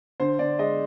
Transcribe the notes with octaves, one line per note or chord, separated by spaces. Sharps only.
D3 C5
D3 D5
G#3 D#5